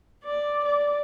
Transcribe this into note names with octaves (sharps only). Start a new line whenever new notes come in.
D5
D5